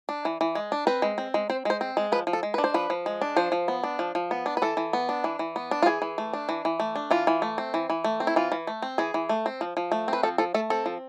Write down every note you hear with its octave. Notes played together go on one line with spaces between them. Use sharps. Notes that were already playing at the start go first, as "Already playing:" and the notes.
D4
E3
E3
G#3
D4
C4 B4
G#3
C4
G#3
C4 C5
G#3 C5
C4
G#3
F3 B4
F3
A4
G#3
D4 B4
C5
F3 B4
F3
G#3
D4
F3 C5
F3
B3
D4
F3
F3
B3
D4
B4
E3 A4
E3
B3
D4
E3
E3
B3
D4
F4
E3 G#4
E3
A3
D4
E3
E3
A3
D4
E3 F4
E3
A3
C4
E3
E3
A3
C4
E4
E3 F4
E3
A3
C4
E3 G#4
E3
A3
C4
F3
F3
A3
C4 B4
F3 A4
F3 A4
A3 A4
C4 A4
F3